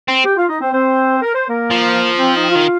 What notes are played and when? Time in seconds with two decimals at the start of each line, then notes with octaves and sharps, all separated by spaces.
0.08 C4
0.25 G4 G5
0.37 F4 F5
0.49 D#4 D#5
0.61 C4 C5
0.74 C4 C5
1.22 A#4
1.35 C5
1.48 A#3 A#4
1.70 F3
2.18 C4 C5
2.34 D#4 D#5
2.43 G5
2.51 D#3 F4 F5